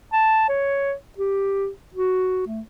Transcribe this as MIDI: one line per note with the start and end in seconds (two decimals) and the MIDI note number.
0.13 0.46 81
0.49 0.94 73
1.18 1.69 67
1.94 2.46 66
2.47 2.60 57